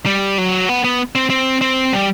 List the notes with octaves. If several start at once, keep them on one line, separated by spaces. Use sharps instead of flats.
G3
F#3
B3
B3
C4
C4
C4
G3